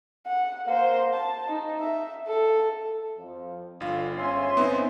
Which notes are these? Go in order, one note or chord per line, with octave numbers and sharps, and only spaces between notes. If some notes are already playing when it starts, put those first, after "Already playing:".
F#5
A#3 C5
A5
D#4
E5
A4
F2 F3
G1 D3 F4
G#2 C#4 C#5 E5 G#5 C6
B3 C4 D#4